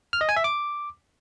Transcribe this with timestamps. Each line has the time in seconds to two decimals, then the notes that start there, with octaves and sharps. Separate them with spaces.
0.13 F6
0.21 D#5
0.29 G#5
0.36 E5
0.44 D6